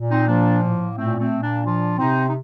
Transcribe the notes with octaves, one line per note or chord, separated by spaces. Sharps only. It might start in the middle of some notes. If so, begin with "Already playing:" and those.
Already playing: A#2
C4 D#4
F3 A#3 D4
A2 A#3
A#2 A3 C4
A3 C4
A#2
A#3 D4
F3 D4 F4
C3 C4 D#4
D#4